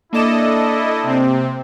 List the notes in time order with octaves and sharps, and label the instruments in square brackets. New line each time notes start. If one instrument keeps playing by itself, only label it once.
[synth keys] A#3 D6 E7 [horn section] D4 E4 [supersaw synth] A4 D#5
[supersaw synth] C3 C4